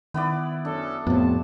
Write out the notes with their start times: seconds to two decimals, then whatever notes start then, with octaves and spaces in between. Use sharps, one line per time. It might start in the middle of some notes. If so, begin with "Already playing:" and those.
0.14 D#3 B3 E4 D5
0.65 F#2 C#4 D4 A4
1.07 F2 A2 C3 B3 A5